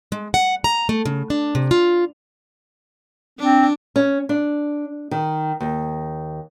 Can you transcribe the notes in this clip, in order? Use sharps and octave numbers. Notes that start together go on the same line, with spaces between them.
G#3
F#5
A#5
A3
C#3
D4
C3
F4
C4 D4
C#4
D4
D#3
D#2